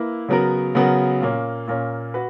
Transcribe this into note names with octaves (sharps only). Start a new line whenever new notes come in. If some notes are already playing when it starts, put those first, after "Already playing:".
Already playing: A#3 E4 B4
C#3 F#3 B3 F#4 A#4
C#3 F#3 B3 F#4 A#4
A#2 A#3 C#4
A#2 A#3 C#4
F#4 B4